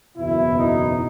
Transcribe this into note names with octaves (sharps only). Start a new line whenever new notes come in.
F#1 E2 B2 E4
D#4